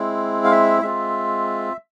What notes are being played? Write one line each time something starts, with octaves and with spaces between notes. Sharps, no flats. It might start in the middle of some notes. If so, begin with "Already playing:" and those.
Already playing: G#3 C4 E4
F5
E5
G#3 C4 F4 E5